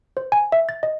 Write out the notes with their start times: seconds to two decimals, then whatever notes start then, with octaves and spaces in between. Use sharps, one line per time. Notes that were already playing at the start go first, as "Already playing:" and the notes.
0.17 C5
0.32 G#5
0.52 E5
0.69 A6
0.83 D#5